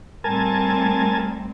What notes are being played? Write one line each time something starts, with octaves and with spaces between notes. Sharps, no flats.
A2 G3 C4 A#4 G#5 A5